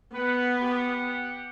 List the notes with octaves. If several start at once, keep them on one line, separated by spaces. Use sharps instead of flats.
B3 B4 F#5
G4 F#5